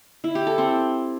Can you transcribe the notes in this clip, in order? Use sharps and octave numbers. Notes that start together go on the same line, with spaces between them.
E4
G4
A4
C4